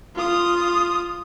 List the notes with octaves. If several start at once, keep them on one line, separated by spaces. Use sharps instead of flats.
F4 D#6